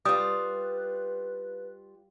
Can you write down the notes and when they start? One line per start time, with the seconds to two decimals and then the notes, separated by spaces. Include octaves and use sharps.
0.05 G3 F4 B4 D#6